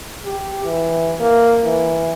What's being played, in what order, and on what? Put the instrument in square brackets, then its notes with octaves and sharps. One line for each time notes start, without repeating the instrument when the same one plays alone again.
[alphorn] G4
E3
A#3
E3